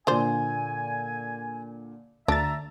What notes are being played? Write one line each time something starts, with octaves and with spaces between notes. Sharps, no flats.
A#2 D3 D4 F4 C5 G#5
D2 D3 D4 E5 A#5 A6